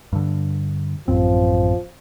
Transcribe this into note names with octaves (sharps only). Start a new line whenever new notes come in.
G2 D3
A1 F#2 F3 C4